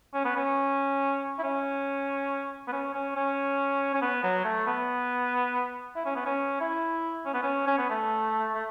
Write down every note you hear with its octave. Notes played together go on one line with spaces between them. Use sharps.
C#4
B3
C#4
E4
C#4
B3
C#4
C#4
C#4
C#4
B3
F#3
A3
B3
E4
C#4
B3
C#4
E4
C#4
B3
C#4
C#4
B3
A3
A3